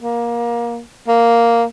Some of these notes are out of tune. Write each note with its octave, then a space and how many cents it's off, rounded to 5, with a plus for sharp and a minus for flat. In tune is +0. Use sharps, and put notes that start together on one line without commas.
A#3 +20
A#3 +0